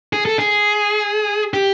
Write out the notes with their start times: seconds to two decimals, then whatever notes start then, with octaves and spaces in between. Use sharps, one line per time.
0.13 G#4
0.26 A4
0.39 G#4
1.54 G4